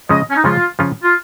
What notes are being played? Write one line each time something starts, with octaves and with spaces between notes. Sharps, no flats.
C#3 F3 G#3 C#4 D#5
C#4
D#4
C#3 F3 G#3 C#4 F4
C#3 F3 C#4 F4
F4